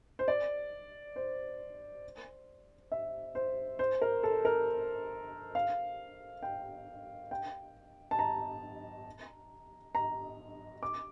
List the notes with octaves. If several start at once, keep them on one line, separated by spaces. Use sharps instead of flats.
C5
D5
C5
E5
C5
C5
A#4
A4
A#4
F5
G5
G5
A5
A#5
A#5
D6